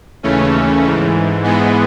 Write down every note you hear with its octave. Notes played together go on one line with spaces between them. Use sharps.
D#2 C#3 E3 A3 C#4
G#2 E3
G#2 E3 G#3 B3